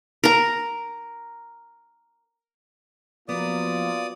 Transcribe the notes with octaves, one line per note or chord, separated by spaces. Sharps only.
A#4 A#5
F3 F#3 A#3 B3 F4 D5 D#6